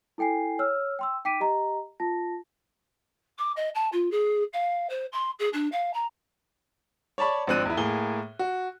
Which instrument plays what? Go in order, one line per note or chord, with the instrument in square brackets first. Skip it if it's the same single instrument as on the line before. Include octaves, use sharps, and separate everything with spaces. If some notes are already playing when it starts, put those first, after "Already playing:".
[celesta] E4 A4 G5 G#5 C7
C#5 E6 F6
G5 C6 E6
D#4 G5 D6 B6 D7 D#7
G4 D#5 A#5
F4 A5 A#6
[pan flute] D6
D#5
A5
F4
G#4
F5
C5
C6
G#4
D4
F5
A#5
[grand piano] C#5 D5 A5 B5 C#6
G#1 F3 C4 D4 F#6 D#7
E2 E4
A2 A#3 G#4 G7
F#4